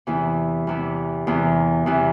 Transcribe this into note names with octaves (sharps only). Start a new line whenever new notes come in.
E2 C3 E3
E2 C3 E3
E2 C3 E3
E2 C3 E3